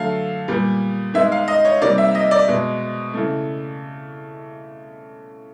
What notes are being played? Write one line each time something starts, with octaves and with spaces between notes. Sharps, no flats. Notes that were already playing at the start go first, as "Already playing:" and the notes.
Already playing: D3 F#3 A3 F5
A#2 G3 B3
D#3 G#3 B3 E5
F5
D#5
C#5
C3 D#3 G3 A#3 D5
E5
D#5
D5
B2 G#3 B3
C#3 E3 A3